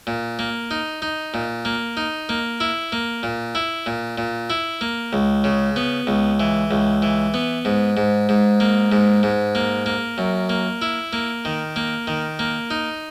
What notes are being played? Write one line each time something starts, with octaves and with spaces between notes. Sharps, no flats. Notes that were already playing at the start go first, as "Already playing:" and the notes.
A#2
A#3
D#4
D#4
A#2
A#3
D#4
A#3
E4
A#3
A#2
E4
A#2
A#2
E4
A#3
C#2
C#3
B3
C#2
E3
C#2
E3
B3
G#2
G#2
G#2
A#3
G#2
G#2
A#3
A#3
F#2
A#3
E4
A#3
D#3
A#3
D#3
A#3
D#4